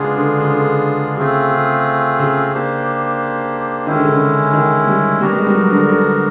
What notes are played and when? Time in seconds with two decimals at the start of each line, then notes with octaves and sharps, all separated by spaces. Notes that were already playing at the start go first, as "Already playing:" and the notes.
Already playing: C#3 G#3 B3 D4 F4 G#4
0.17 D3
0.40 C#3
0.51 D3
1.18 C#3 A3 C4 F4 G#4
1.52 C#3
2.19 C#3
2.53 A#3 D4 G4 C5
3.87 D#3 G#3 C#4 E4
3.96 D3
4.05 C#3
4.13 D3
4.54 D#3
4.87 G3
5.21 G3 B3 D4 F#4 A#4
5.33 G3
5.38 G#3
5.47 G3
5.54 F#3
5.72 D3
5.88 D3